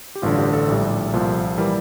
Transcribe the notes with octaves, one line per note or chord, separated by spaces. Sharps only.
G4
A1 G2 D3 F4
G4
A4
A#1 A2 G3
C2 A#2 F3
E3 G3 A#4